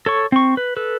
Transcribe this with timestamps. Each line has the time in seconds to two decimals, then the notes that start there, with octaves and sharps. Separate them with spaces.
0.06 A4 C#5 C#6
0.32 C4 C#6
0.57 B4
0.77 A4 B4